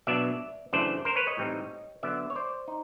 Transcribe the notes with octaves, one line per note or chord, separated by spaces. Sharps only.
B2 F#3 B3 D4 D5 E5
F#2 C#3 E3 A3 D4 C5 D5
A#4 C5
B4 C#5
C#5 D#5
A2 E3 G3 C4 D#4
D3 F#3 B3 D5 E5
C#5
C5 D5
D#4